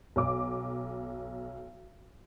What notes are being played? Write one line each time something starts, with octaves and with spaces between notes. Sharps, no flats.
B1 D6